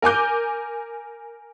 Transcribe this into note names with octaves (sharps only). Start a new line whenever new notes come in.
A#4 G#5 D6 G6